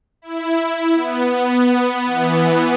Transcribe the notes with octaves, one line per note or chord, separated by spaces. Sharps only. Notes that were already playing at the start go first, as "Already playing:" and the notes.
E4
E4
B3
B3
E3